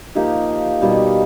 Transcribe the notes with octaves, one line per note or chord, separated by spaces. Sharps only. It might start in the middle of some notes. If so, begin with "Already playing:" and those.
F3 A#3 D#4 G4
B2 G3 A#3 D#4